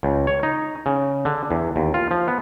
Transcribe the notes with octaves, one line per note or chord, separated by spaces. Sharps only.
C#2
C#5
D#4
C#3
D3
E2
D#2
F4
F3
B3